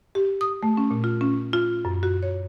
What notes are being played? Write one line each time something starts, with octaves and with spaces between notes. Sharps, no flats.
G4
D#6
A3
C#4
A#2
F4
C#4
F4
F#2
F#4
C#5